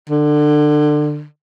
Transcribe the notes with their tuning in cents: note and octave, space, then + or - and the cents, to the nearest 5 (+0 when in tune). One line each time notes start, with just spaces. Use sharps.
D3 +25